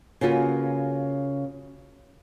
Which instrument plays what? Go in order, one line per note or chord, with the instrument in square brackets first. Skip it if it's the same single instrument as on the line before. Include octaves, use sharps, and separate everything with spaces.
[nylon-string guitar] C#3 A#3 C#4 F4 F#4 B4